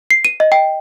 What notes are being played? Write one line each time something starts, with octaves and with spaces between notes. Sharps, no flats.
C7
D#7
D#5
G5